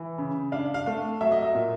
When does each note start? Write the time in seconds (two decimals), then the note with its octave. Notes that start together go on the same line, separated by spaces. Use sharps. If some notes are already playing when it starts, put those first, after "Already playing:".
Already playing: E3
0.18 C#3
0.52 D4 F5
0.74 F5
0.86 A3 F5
1.21 F#3 E5
1.32 D#5
1.42 E5
1.55 A#2